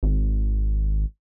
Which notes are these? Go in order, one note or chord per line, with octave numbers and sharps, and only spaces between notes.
G#1